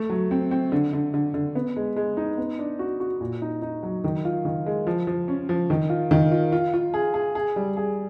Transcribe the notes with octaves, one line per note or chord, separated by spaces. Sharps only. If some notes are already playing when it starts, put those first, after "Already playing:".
Already playing: A3
F#3
C4
C4
D3
D3
D3
D3
B3
G#3
G#3
D#4
B3
D4
F#4
F#4
A#2
D#4
D#4
F#3
D#3
F4
D#3
G#3
F3
F3
C#4
F3
D#3
F4
D#3
F4
F4
F4
G#4
G#4
G#4
G3
G#4